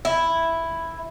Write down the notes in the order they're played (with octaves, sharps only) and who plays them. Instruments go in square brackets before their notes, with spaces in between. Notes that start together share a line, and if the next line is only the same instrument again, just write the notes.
[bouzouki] E4